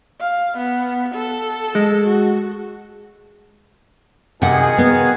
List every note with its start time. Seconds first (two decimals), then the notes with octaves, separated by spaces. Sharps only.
0.20 F5
0.58 B3
1.15 A4
1.75 G#3
2.07 F#4
4.42 C3 D#3 F#4 G#4 F#5
4.78 B3